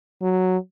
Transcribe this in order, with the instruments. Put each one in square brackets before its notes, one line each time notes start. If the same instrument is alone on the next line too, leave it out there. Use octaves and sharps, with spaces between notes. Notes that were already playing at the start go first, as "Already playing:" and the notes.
[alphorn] F#3